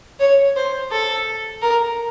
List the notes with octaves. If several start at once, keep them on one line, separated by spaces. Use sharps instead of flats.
C#5
C5
A4
A#4